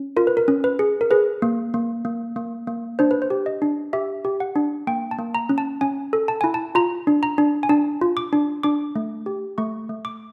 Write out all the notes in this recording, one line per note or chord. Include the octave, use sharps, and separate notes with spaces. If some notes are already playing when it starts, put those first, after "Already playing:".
Already playing: C#4
F4 A#4
B4
A#4
C#4
B4
G#4
A#4
G#4 B4
A#3
A#3
A#3
A#3
A#3
D4 C5
B4
C5
G4
D#5
D4
G4 E5
G4
F#5
D4
A#3 G5
A5
A#3
A#5
C#4
A5
C#4 G#5
A4
A5
E4 G#5
A5
F4 A#5
D4
A#5
D4
G#5
D4 A5
F4
D6
D4
D4 D6
A3
G4
A3 C#6
A3
D6